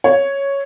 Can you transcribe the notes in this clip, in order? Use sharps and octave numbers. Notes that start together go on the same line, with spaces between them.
C#5